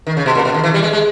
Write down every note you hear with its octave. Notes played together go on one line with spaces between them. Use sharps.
D#3
C#3
B2
A#2
B2
D#3
E3
G3
G#3
G#3